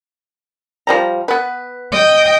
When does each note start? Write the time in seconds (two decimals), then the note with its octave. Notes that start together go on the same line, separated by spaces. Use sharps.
0.87 F3 G3 A#5
1.28 B3 B4
1.92 D#5 G5